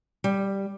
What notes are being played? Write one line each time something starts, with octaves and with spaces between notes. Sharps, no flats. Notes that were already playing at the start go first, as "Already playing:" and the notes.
G3